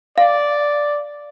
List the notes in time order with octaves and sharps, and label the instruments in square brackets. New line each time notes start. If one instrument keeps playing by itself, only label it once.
[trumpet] D5 [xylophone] F5